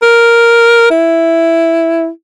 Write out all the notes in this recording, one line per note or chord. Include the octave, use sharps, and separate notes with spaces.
A#4
E4